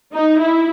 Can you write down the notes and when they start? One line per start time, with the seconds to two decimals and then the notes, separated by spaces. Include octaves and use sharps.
0.13 D#4
0.41 E4